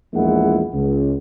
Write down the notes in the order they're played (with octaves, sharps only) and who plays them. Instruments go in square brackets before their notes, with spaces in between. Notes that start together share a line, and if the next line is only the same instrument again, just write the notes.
[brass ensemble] A#1 E2 A#2 G#3 E4 F#5
C#2